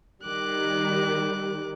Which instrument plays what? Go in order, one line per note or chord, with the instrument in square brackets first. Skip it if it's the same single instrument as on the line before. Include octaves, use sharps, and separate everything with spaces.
[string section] D#3 G3 [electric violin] D6 F#6